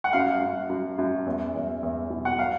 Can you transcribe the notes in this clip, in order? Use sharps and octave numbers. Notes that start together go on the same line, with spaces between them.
F#5
F#2 F5
F#2
F#2
F#2
E2
E2
E2
B2
F#5
F#3 F5